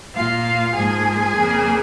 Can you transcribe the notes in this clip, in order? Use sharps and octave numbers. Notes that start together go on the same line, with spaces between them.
A#2 A#3 F4 F5
G#2 F3 A#3 G#4 G#5
F2 C#3 A#3